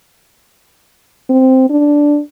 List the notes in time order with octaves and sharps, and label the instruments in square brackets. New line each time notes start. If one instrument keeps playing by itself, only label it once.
[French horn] C4
D4